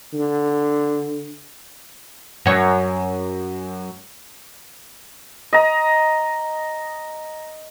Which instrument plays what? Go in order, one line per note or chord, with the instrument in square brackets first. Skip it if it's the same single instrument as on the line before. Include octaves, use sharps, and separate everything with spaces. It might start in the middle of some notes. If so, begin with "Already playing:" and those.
[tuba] D3
[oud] F#2 C#5
[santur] D#5 A#5